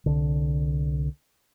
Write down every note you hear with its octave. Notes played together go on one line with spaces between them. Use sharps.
C2 D3